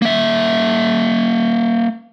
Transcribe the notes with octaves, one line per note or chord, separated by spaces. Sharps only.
A#3 E5